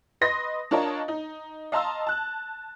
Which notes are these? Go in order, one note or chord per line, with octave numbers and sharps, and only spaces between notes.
B4 D#5 C6 D#6 A#6
D4 F4 A#4 C#5 D#5 A5
D#4
D#5 F5 A5 A#5 C6 E6
A5 F#6